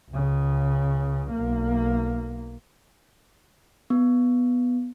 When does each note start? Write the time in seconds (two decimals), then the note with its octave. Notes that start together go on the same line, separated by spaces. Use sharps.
0.11 C#2 C#3
1.31 B1 A#3
3.90 B3